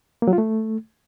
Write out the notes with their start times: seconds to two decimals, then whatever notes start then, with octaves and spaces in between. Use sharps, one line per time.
0.22 A#3
0.28 F#3
0.33 F4
0.38 A3